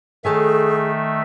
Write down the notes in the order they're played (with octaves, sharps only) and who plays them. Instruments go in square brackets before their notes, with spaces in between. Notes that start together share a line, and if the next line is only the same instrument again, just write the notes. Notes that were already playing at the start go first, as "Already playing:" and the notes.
[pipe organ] D#3 A3 E5 [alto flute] G#4 [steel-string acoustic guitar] A4 C#5 G#5